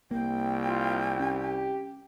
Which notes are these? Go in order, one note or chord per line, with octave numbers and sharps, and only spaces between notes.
C2 A#3 G5
F4
C#4 G4